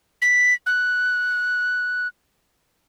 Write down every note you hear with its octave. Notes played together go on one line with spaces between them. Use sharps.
B6
F#6